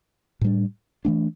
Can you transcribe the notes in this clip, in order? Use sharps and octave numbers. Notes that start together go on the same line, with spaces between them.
A2 G3 D4
E3 A3 D4